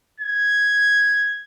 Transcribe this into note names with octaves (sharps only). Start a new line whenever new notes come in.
G#6